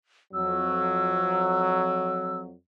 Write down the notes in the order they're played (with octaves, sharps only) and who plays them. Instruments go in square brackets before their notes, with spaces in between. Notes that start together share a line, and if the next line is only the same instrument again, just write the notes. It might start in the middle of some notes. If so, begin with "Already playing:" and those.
[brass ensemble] F2 F#3 [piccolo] E6